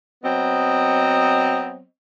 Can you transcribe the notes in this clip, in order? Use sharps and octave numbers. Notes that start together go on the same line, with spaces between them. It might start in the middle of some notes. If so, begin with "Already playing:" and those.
F#3 B3 C4 D#5